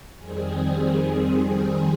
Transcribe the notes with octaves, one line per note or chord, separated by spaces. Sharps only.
F2 D#3 G3 C4 G#4